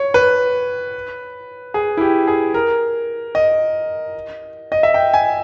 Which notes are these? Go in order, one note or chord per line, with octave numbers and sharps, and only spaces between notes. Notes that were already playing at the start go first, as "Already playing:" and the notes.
Already playing: C#5
B4
G#4
E4
G4
G#4
A#4
D#5
D#5
E5
G5
G#5